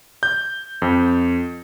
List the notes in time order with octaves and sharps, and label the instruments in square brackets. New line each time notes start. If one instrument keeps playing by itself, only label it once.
[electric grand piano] G6
F2